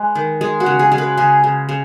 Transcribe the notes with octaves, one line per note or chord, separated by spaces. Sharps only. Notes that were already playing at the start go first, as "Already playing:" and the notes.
Already playing: G#3 B4
D#3
G#3 G#4
F#4
C#3
G#4
G#3 G#4
B4
C#3 G#4
C#3
C#3